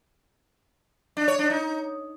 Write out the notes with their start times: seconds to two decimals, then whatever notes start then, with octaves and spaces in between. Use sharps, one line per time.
1.17 D4
1.28 C#5
1.39 D4
1.50 D#4